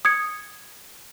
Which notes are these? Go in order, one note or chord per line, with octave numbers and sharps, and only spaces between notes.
D#6 G#6 C#7